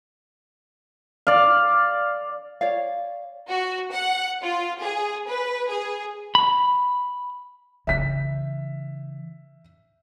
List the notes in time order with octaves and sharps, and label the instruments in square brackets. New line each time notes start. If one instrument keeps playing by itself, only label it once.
[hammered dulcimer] D5 F5
[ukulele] C#5 D5 F5
[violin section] F#4
F#5
F4
G#4
B4
G#4
[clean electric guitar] B5
[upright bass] C#3 E3 [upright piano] E5 B6